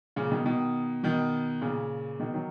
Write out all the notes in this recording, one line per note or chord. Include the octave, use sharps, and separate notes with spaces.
A#2 C#3
B2 D#3
B2 D#3
B2 D#3
A#2 C#3
B2 D#3
D#3 F#3